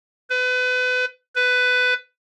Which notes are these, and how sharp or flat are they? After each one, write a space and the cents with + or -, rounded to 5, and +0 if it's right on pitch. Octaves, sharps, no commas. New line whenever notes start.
B4 +30
B4 +15